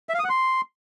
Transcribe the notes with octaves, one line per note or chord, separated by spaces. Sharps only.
E5
F5
D#6
F#5
C6